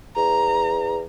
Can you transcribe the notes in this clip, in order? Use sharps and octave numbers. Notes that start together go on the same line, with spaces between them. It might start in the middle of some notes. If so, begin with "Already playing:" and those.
E2 A#5